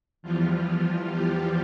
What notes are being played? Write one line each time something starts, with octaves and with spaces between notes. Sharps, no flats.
E2 E3 F3 G3 F4
G3 G4